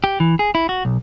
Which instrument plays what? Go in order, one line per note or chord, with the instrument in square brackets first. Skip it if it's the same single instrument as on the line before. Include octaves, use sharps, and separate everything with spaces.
[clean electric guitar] G4
E3
G#4
E4
F#4
B1